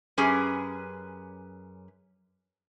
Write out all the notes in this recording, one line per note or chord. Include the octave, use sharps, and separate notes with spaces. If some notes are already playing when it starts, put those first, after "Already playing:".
F#2 C#4 G4 G#4 B4